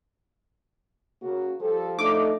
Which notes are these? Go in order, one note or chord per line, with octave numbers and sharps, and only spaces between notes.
C#3 A#3 F#4
F3 G3 A4
A3 D4 D#4 D6